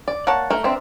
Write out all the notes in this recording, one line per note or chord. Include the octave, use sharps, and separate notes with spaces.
D5
A#3 C#5 F#5 A5
A3 A#4
C4 D4 E5